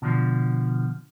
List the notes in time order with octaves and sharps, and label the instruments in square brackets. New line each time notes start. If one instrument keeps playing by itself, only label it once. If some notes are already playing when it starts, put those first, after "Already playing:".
[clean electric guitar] B2 D3 F3